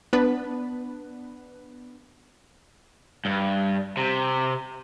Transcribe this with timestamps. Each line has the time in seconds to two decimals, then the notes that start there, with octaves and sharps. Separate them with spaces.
0.13 B3 D4 B4
3.25 G2
3.97 C3